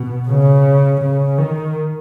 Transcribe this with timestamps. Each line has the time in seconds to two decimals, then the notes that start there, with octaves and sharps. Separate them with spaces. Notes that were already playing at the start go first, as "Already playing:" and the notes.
Already playing: B2
0.28 C#3
1.02 C#3
1.38 D#3